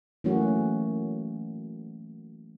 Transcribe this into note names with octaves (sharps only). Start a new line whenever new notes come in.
E3 F#3 A3 A#3 C#4 F#4